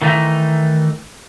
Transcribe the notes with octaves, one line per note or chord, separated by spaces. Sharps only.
D#3 E3 A3 D#4